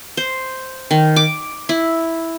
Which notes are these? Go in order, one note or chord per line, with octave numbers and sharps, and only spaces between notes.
C5
D#3
D6
E4